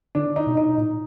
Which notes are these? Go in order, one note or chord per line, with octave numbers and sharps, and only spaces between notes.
D3 D4
D#4
B2
D#4
A#2 D#4